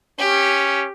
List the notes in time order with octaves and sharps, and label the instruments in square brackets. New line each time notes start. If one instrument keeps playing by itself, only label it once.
[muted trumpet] C#4 [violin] G4